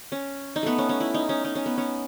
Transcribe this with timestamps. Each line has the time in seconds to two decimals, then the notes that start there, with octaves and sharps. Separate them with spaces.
0.12 C#4
0.56 D#4
0.63 A3 B3
0.78 C#4
0.89 C#4
1.00 E4
1.14 D#4
1.29 C#4
1.45 D#4
1.56 C#4
1.66 B3
1.78 C#4